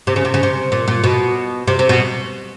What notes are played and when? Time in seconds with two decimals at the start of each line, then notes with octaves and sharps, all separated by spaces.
0.07 C3
0.16 C#3
0.25 C3
0.34 C#3
0.43 C3
0.72 A#2
0.88 A#2
1.04 B2
1.67 C3
1.79 C3
1.89 B2